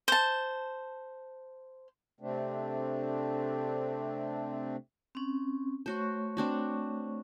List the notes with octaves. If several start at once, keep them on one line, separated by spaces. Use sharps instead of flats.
C5 A5
C3 A3 C4 D4
C4 C#4
A3 F#4 C5 C#5 C#6
C4 D4 F#4